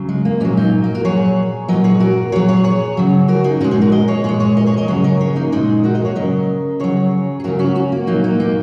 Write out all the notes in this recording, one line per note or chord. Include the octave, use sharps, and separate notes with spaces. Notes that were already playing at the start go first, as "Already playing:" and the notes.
Already playing: C#3 F#3
G#3
A#3
A#2 F#3 G#3 C#4
A#3 D#4
A#3
F#4 A#4
A#2 F#3 G#4 C#5
A#2 F#3 A#4 D#5
G#4 C#5
F#4 A#4
A#2 F#3 G#4 C#5
G#4 C#5
G#4 C#5
C#3 F#3
F#4 A#4
D#4 G#4
A#2 G#3 C#4 F#4
D#4 G#4
F#4 A#4
A#4 D#5
G#4 C#5
A#2 G#3 G#4 C#5
G#4 C#5
A#4 D#5
G#4 C#5
A#4 D#5
C#3 F#3 G#4 C#5
A#4 D#5
G#4 C#5
A#3 D#4
A#2 G#3 D#4 G#4
F#4 A#4
A#4 D#5
G#4 C#5
C#3 F#3 A#4 D#5
C#3 F#3 G#4 C#5
G#4
C#3 F#3 F#4 A#4
C#4 F#4
C#4 F#4
A#3
A#2 F#3 A#3 D#4
A#3 D#4
A#3 D#4